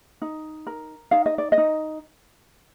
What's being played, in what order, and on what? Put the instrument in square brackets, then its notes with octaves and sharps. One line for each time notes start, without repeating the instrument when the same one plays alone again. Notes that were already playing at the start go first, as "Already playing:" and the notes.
[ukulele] D#4
A#4
D#4 F5
D#5
D5
D#5
D#4